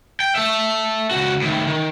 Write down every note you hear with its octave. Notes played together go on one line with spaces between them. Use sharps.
G5
A4 E5
C#2 F#4
A2 D#3
D#3